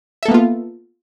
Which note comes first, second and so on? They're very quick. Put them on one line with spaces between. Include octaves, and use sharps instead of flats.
E5 A4 A#3 B3 F4